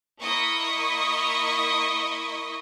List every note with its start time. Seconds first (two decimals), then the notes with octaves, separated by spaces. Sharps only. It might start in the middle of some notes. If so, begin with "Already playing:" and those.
0.22 A#3 E4 D#5 C#6 D#6 B6